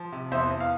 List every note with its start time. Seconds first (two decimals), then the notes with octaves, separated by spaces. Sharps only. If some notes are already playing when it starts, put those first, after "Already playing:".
Already playing: F3
0.12 C3
0.31 E2 C5 E5
0.50 E2
0.60 F5